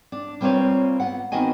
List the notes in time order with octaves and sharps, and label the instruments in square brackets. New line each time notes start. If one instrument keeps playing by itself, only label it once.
[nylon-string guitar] D4
G3 A#3 C4 F4 B4 C#5
B3 F#5
D#3 B3 C4 F#4 D#5 G#5